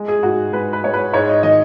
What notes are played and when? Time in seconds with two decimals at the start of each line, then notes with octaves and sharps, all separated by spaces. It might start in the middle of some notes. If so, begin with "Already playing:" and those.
Already playing: G#3
0.08 G#4
0.23 G#2 F#4
0.52 G#3 B4
0.73 B4
0.83 G#3 C#5
0.94 B4
1.13 G#2 C#5
1.29 D#5
1.43 D#3 D#5